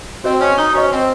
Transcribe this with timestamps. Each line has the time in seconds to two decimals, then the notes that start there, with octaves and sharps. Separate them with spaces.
0.24 C4 F#4 C5 D#5
0.41 C#4
0.58 D#4
0.74 C#4 F#4 C5 D#5
0.91 C4